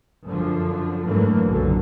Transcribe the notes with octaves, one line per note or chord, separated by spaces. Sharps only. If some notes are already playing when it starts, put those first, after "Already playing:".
F#2 D3 F3
G#2 D3 E3 F#3 A3 A#3
F#1 B1 F#2 A#2 D3